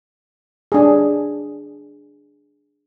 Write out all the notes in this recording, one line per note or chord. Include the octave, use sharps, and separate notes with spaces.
D4 G#4